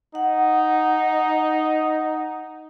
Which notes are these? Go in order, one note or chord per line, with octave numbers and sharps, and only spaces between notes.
D#4 F#5